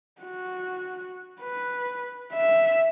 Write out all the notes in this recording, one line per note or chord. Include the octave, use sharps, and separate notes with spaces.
F#4
B4
E5